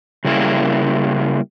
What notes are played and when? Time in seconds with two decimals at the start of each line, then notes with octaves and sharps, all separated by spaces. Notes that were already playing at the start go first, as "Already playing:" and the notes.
0.25 C#3 G3 A#3 E4